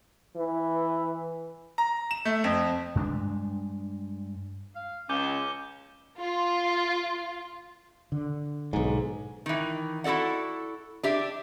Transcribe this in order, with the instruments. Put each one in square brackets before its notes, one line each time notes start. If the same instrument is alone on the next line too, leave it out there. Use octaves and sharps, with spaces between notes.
[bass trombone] E3
[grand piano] A#5
E7
A3
F2
[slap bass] G2 G#3 A3 D4
[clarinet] F5
[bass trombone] C#2 [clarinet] C#4 [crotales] D6 G6 G7
[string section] F4
[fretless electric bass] D3
[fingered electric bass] B1 G#2
[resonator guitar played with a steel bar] D#3 E3
E4 F#4 A4 D5 F#5
D4 G4 E5